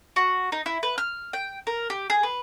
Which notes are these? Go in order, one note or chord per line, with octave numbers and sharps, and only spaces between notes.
F#4
D#4
E4
B4
F6
G5
A#4
G4
G#4
B4